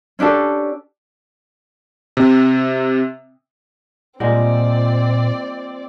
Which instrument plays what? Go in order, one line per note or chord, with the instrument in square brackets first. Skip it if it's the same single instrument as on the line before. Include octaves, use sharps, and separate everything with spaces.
[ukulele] C#4 D4 G4 A4
[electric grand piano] C3
[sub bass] A#2 [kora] G3 G#3 A#3 [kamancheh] C4 D5 [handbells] F4 F#5